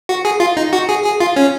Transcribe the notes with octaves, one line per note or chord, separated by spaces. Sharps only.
F#4
G#4
F4
D#4
F#4
G#4
G#4
F4
C#4